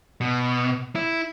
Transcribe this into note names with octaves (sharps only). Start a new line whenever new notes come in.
B2
E4